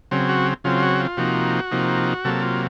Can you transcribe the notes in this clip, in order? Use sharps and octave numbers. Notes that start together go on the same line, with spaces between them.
C#3 F#3 C4
F#4
C#3 F#3 C4 F4
F#4
F4
C3 F3 A#3 D#4 F#4
C3 F3 A#3 D#4
C3 F#3 A#3 A4
F4